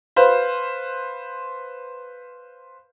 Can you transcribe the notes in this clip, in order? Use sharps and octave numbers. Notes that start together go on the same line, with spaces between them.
B4 C5 F5